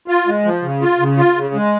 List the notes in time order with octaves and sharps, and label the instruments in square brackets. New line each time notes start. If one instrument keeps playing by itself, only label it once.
[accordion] F4
G#3
F3
C#3
F4
C#3
F4
C#3
G#3